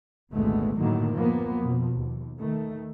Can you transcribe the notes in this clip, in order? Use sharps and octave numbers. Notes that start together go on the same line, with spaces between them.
G#1 D2 A#2 G#3 A3 B3
F#2 A2 D3 D#3 F#3 A#3
F3 A#3 B3
F2 B2 F3
D#2
D#3 A3